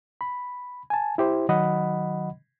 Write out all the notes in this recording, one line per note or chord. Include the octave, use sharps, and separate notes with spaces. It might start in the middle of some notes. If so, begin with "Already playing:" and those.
B5
G#5 A5
E4 G4 C5
D#3 F#3 D#5 F#5 B5